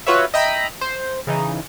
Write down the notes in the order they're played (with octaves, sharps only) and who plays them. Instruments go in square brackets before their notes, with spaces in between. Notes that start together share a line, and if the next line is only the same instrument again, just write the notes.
[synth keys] F4 F#4 B4 C#5 E5
D#5 E5 G5 A#5 B5
C5
C#3 E3 D#4